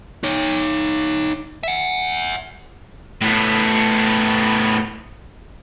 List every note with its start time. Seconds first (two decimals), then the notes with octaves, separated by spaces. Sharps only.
0.23 D#4 C#5
1.63 E5 F#5
3.21 A2 B3